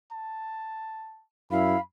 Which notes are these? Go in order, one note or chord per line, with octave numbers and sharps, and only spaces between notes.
A5
F#2 E4 F5 B5